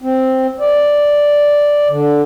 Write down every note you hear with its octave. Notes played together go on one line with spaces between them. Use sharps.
C4
D5
D3